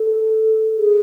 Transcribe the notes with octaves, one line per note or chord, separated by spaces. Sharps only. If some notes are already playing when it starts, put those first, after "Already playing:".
Already playing: A4
G#4